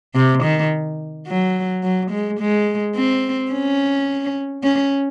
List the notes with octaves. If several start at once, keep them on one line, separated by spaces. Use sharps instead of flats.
C3
D#3
F#3
F#3
G#3
G#3
C4
C#4
C#4